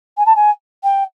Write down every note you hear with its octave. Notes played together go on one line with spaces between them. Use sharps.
G#5
A5
G#5
G5